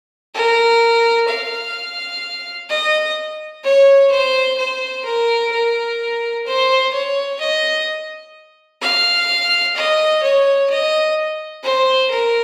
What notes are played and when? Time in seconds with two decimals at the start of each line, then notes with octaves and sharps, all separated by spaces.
0.34 A#4
1.28 F5
2.70 D#5
3.64 C#5
4.11 C5
4.57 C5
5.04 A#4
5.52 A#4
6.46 C5
6.93 C#5
7.40 D#5
8.81 F5
9.75 D#5
10.23 C#5
10.70 D#5
11.63 C5
12.10 A#4